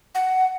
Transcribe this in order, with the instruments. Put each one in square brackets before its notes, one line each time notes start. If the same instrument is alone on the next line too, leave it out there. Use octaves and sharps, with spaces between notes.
[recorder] F#5